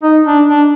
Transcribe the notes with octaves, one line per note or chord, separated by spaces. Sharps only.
D#4
D4
D4